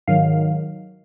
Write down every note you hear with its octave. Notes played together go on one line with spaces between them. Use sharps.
G#2 D#3 F#3 F5